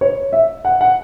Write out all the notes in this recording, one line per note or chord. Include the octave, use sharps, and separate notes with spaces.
C#5
E5
F#5
F#5